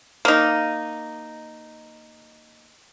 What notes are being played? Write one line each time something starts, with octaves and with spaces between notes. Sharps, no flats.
A#3 D#4